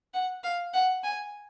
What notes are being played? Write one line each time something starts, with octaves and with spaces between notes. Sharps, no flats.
F#5
F5
F#5
G#5